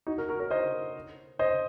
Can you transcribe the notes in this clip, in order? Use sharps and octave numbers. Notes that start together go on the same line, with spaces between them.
D#4 F#4
F#4 A#4
F#4 A#4
A#4 C#5
C5 D#5
C5 D#5